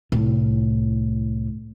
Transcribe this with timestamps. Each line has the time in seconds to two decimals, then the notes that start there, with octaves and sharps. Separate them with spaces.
0.12 C2 A2